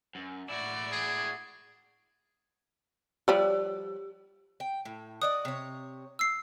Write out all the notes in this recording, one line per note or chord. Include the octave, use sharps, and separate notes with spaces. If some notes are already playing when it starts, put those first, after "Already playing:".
F#2
A2 E4 F#4 D5
G#4
F3 G3 G4 D5
G5
A2
F#4 D5 D#5 D#6
C3 C#5
E6 C7